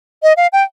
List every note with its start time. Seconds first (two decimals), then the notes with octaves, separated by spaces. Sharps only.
0.23 D#5
0.37 F5
0.53 G5